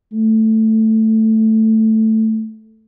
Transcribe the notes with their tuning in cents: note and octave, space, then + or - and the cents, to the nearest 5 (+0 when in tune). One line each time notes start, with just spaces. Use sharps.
A3 +5